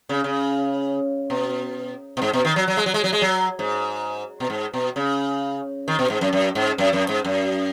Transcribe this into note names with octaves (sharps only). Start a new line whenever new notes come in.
C#3
C#3
B2
B2
G#2
B2
D#3
F#3
F#3
G#3
F#3
G#3
F#3
G#3
F#3
G#2
B2
G#2
B2
C#3
D#3
B2
G#2
F#2
F#2
G#2
F#2
F#2
G#2
F#2